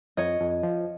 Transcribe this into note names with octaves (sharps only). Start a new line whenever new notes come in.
F2 C#5 D#5
F2
F3